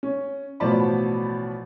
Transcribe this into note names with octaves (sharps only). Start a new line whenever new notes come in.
C#4
A1 B2 F3 D5 A5 B5